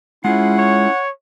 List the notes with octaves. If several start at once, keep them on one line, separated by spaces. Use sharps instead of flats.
G#3 C#4 E4 F4 G#4 F#5
C#5